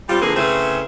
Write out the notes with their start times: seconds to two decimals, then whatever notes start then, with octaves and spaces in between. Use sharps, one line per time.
0.09 G3 C4 F4
0.21 D3 E3 F3 A#3 C4 G#4
0.36 C#3 A3 B3 C4 E4 G#4